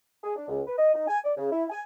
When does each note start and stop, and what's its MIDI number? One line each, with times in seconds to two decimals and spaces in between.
0.23 0.33 68
0.36 0.45 62
0.48 0.60 37
0.66 0.78 71
0.78 0.90 75
0.94 1.07 63
1.08 1.19 80
1.24 1.32 74
1.37 1.49 49
1.52 1.64 64
1.70 1.81 80